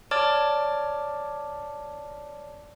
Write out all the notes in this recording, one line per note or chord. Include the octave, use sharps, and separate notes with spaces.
C#5 D5 A5 D6 F6 A6